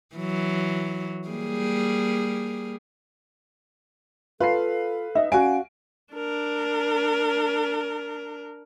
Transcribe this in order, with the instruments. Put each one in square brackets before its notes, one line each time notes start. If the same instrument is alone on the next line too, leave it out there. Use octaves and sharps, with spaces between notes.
[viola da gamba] E3 F#3
G3 A#3 G#4
[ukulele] F4 A5 [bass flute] A4 [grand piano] B4 [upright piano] F5 C7
[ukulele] D#4 D#5 [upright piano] E5
[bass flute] C#4 [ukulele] F#4 D5 F5 [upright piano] F#5 D7 [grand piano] G#5
[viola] D4 A#4